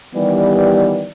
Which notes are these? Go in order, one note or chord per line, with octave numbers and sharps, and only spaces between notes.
D#3 E3 G3 B3 G4 D5